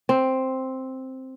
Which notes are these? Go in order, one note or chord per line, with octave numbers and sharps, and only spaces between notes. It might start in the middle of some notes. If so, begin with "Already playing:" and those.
C4